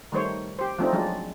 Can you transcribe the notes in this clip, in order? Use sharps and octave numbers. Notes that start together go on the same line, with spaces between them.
D#3 G3 A3 C5 C#5
G4 C5
F3 A3 C4 D4 D#4
F3 F#3 G#3 D4